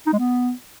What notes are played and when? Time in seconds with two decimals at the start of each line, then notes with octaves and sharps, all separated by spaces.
0.07 D#4
0.13 G#3
0.19 B3